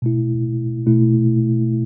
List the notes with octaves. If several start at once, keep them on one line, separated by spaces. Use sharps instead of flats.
B2 A3 E4
B2 A3 E4